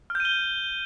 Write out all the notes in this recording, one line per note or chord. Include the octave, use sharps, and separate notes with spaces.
F6
G6
D#7
G7